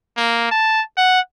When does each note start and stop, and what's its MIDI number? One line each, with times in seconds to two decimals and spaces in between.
0.17 0.47 58
0.51 0.82 81
0.97 1.20 78